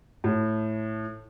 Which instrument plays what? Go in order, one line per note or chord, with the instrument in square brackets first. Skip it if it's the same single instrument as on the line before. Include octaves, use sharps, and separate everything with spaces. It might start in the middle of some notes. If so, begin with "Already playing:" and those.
[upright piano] A2